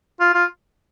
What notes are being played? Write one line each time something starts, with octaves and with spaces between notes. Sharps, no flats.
F4
F4